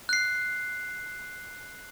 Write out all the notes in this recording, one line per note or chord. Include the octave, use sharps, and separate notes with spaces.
F#6 C7